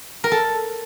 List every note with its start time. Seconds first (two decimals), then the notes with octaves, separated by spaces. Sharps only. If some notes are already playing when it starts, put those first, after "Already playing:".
0.24 A#4
0.31 A4